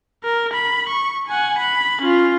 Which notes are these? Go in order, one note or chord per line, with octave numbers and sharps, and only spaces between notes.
A#4
B5
C#6
F#5 G#5
B5
C#4 F4